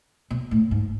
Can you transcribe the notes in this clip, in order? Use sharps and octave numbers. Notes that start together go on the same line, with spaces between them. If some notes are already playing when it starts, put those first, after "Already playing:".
B2
A2
G#2